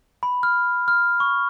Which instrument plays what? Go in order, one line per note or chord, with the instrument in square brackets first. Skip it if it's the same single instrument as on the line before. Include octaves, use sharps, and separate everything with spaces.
[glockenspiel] B5
F6
F6
C#6